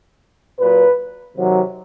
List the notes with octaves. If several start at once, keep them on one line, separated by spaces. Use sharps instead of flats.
A#2 F#3 B4
C3 D#3 F#3